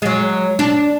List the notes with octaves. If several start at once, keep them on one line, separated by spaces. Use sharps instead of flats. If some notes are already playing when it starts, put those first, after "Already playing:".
F#3 G#3
D4